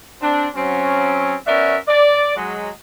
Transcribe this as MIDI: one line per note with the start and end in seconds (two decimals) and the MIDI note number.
0.22 0.48 60
0.22 0.48 62
0.55 1.35 54
0.55 1.35 60
0.55 1.35 61
1.47 1.77 59
1.47 1.77 61
1.47 1.77 66
1.47 1.77 70
1.47 1.77 74
1.47 1.77 76
1.88 2.35 74
2.36 2.70 54
2.36 2.70 56